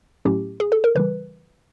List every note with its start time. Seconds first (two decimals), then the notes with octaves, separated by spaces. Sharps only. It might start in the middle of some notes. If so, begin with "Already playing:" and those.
0.25 A2 F#3 A3 C#4 E4 G4
0.60 G#4
0.72 A4
0.84 A#4
0.95 C#3 E3 G3 B4